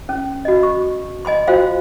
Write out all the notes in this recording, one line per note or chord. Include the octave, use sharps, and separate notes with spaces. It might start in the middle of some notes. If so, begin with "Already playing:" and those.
C#4
F#4 D#5
C#6
D#5 G#5 B5 C6
F4 F#4 C5 F5 G5 C6